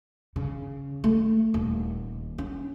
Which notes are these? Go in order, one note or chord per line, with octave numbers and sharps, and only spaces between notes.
C#3
A3
D#1
C#4